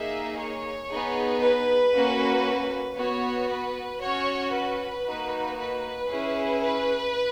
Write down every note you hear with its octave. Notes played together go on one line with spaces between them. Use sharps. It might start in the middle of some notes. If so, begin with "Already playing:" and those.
Already playing: A#3 D#4 G#4 E5
C#5
B3 D#4 G#4
B4
A#3 C#4 F#4
B3 F#4 C#5
B4
C#4 F#4 C#5
B4
A#3 D#4 F#4
B4
C#4 E4 G#4
B4